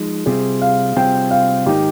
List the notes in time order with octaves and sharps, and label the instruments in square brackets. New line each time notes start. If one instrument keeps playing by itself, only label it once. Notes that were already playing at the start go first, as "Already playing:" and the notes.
Already playing: [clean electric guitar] F3 G#3 D#4
[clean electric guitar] C3 G3 C4 F4 [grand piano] G#4
[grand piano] F5
[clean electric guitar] C3 G3 C4 F4 [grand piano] G5
[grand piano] F5
[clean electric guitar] G#2 D#3 A#3 D#4 [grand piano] G4